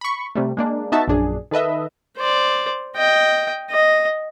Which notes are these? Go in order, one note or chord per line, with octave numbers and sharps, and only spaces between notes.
B5 C#6
C3 G3 A3
G#3 A#3 D4
B3 D#4 F#4 E5 A5
A#1 F#2 D4 G#4
D#3 A4 B4 D#5 E5
C5 D5
D#5 G5
D#5